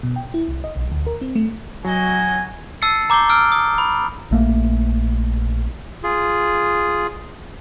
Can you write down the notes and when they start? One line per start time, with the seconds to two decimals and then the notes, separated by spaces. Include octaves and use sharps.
0.03 B2
0.16 G5
0.34 E4
0.48 C2
0.64 D#5
0.76 B1
0.92 D2
1.07 A#4
1.21 C4
1.35 A3
1.84 F#3 F#4 D#5 G#5
2.82 A5 E6 A6 C7 C#7
3.10 A#5 D6 G6 C7 G7
3.29 E6 F6 D7
3.52 D#6
3.78 B5
4.31 A#1 A3 A#3
6.03 F4 G#4